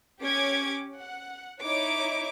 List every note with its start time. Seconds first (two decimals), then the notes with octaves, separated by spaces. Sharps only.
0.21 C#4 G4 C#5 D6 G#6
1.01 F#5
1.63 D#4 E4 C#5 D6